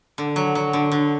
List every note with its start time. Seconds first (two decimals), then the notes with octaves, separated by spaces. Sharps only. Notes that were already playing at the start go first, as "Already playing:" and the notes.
0.18 D3
0.36 F#3
0.55 F#3
0.73 D3
0.92 D3